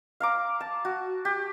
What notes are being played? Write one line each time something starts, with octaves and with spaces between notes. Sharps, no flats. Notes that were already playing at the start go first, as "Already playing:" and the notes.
F5 A#5 D6
A5
F#4
G4